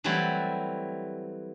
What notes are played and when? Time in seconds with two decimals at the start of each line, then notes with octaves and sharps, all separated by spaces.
0.04 E3 F#3 G3 A3 C4 E4